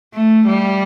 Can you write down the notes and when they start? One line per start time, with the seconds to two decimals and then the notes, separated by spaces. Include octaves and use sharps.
0.14 A3
0.47 G3